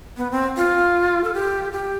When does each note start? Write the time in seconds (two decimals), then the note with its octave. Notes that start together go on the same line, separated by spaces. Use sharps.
0.17 B3
0.31 C4
0.57 F4
1.24 A4
1.34 G4
1.73 G4